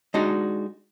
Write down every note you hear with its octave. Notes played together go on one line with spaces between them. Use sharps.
G#3 D4 D#4 F#4